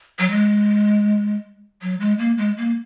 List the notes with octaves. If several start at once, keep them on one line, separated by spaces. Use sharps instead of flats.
F#3
G#3
F#3
G#3
A#3
G#3
A#3